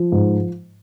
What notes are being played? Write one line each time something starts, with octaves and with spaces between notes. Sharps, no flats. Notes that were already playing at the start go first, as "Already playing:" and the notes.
Already playing: F3
G#2